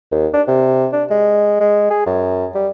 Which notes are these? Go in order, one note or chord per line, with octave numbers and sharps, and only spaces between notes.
D#2
D4
C3
D4
G#3
G#3
G#4
F#2
G3